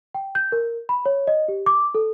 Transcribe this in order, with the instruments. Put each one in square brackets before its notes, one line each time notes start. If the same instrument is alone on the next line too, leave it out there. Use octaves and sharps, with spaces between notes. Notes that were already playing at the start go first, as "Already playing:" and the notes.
[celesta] G5
G6
A#4
B5
C#5
D#5
G4
D6
A4